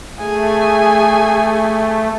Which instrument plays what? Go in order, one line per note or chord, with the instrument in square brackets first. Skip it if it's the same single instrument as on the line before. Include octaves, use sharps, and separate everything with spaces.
[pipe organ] A3 [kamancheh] G#4 G#5